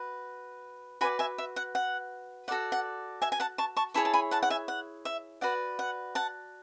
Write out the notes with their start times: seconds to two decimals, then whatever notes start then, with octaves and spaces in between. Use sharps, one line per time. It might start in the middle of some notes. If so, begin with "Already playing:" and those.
Already playing: F#4 B4
1.01 F#4 B4 D5 G#5 B5
1.19 E5 G#5
1.38 E5
1.56 F#5
1.75 F#5
2.48 F#4 A4 D5 F#5
2.72 F#5
3.22 E5 G#5
3.32 G#5
3.40 F#5 A5
3.58 A5 C#6
3.77 A5 C#6
3.94 E4 G#4 C#5 A5 C#6
4.05 A5
4.13 G#5 B5
4.31 F#5 A5
4.43 F#5
4.50 E5 G#5
4.68 F#5
5.05 E5
5.41 F#4 B4 D5 F#5
5.79 F#5
6.15 F#5 A5